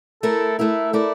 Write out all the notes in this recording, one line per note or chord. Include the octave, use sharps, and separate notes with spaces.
A3 E4 A4 A#4
A3 E4 A#4 E5
A3 E4 A#4 D5